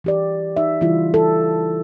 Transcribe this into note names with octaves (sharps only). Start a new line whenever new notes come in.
E3 G4 D5
D#4 E5
C#3 E3 G3 E4 F4
A4